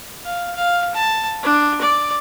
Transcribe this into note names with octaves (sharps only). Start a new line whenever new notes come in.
F5
F5
A5
D4
D5